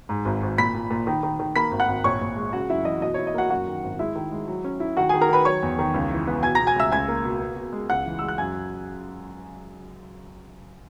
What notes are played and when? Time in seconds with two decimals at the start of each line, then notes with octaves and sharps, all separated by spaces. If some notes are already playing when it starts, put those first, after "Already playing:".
0.09 G#2
0.25 G#1
0.43 G#1
0.58 A#2 B5 B6
0.74 A#2
0.90 A#2
1.07 D#3
1.23 D#3
1.40 D#3
1.56 A#3 B5 B6
1.71 G#1
1.80 F#5 F#6
1.88 G#1
2.04 A#1 C#5 C#6
2.21 A#1
2.36 G#3
2.53 C#3 F#4 F#5
2.70 F#2 E4 E5
2.85 E3 D#5
3.02 B2 D#5
3.14 C#5
3.18 E4
3.27 D#5
3.34 A#3 F#4 F#5
3.50 F#2 F#4 F#5
3.68 D#3
3.83 G#1
3.99 G#3 E4 E5
4.15 D#3
4.32 G#3
4.48 F#3
4.64 C#4
4.80 E4
4.97 D#3 F#4 F#5
5.09 G#4 G#5
5.14 D#3
5.21 A#4 A#5
5.29 D#3 B4 B5
5.45 F#3 C#5 C#6
5.62 E2
5.79 D#3
5.94 C#2
6.11 E3
6.27 B3
6.43 B2 G#5 G#6
6.55 A#5 A#6
6.60 B2
6.67 G#5 G#6
6.76 C#2 E5 E6
6.91 C#2 G#5 G#6
7.08 A#3
7.24 B2
7.40 B3
7.56 B2
7.73 G#3
7.90 C#2 F#5 F#6
8.06 E3
8.19 G#3 E6
8.29 F#6
8.38 F#2 G#5 G#6